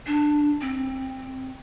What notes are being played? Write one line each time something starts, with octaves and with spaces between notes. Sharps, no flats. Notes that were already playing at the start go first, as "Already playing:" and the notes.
D4
C4